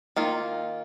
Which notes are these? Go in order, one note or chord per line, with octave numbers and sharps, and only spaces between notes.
D#3 A#3 F4